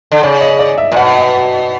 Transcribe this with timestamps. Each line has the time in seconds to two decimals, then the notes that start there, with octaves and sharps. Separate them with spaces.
0.12 D3
0.23 C#3 D5
0.41 D#5
0.59 D5
0.78 E5
0.92 A#2
0.96 B2 F#5